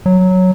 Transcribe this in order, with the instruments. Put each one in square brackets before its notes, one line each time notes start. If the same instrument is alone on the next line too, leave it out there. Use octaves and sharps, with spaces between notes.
[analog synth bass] F#3